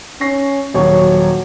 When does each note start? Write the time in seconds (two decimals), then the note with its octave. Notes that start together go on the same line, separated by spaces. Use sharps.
0.21 C#4 C#6 A#6 C7
0.74 D#1 F#3 C#5 C#6